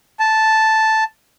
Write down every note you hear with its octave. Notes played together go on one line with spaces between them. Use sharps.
A5